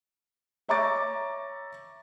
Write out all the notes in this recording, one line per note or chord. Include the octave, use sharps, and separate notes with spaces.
C#5 E5 A#5 C#6 D6 A6